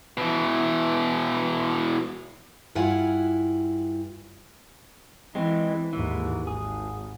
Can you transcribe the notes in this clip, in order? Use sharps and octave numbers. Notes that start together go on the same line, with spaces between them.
B2 E3
G2 E4 F4 F#5 G#5
E3 G#3 C4
D#2 G#2 E3
G#1 G#4